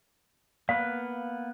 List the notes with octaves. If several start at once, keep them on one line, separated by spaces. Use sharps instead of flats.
A#3 B3 B4 F5